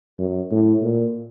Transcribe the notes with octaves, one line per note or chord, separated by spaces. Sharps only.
F#2
A2
A#2